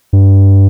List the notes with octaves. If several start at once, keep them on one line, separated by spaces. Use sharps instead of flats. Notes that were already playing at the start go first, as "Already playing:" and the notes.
G2